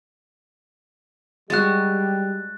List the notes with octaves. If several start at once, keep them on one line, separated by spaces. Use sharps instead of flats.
G3 G#3 F#4 F#6 A6